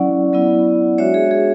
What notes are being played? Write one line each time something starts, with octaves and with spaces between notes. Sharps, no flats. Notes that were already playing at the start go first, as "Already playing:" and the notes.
Already playing: F#3 C#4 E4 D5 F#5
F#3 B3 E4
G#3 D4 F#4 C#5 E5
G#4
G#4